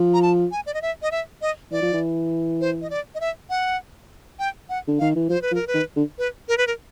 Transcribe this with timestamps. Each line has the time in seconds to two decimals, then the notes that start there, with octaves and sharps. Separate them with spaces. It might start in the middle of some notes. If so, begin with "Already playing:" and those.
Already playing: F3
0.14 A#5
0.23 A5
0.51 G#5
0.66 D5
0.74 D#5
0.82 E5
1.02 D#5
1.11 E5
1.42 D#5
1.71 E3 D5
1.82 F3
1.93 E3
2.61 C5
2.82 D#5
2.90 D5
3.15 D#5
3.20 E5
3.50 F#5
4.39 G5
4.69 F#5
4.87 D3
4.99 D#3 F5
5.15 E3
5.29 F3 C5
5.42 B4
5.51 F3
5.55 A#4
5.67 B4
5.74 D#3
5.96 D3
6.18 B4
6.48 A#4
6.58 B4
6.67 A#4